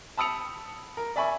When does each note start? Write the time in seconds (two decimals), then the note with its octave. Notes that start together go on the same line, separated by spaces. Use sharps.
0.17 A5 B5 D#6 E6 C#7 F7
0.97 A#4
1.16 D5 E5 G#5 B5 C#6